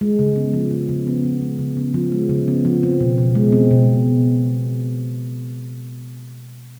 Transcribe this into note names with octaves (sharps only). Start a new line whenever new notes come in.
G#3
C#3
B3
F3
G#3
C#3
B3
F3
G#3
C#3
B3
F3
G#3
C#3
B3
F3
C4
B2
B2
G#3
C4
B2